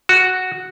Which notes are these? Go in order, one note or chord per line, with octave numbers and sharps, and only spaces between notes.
F#4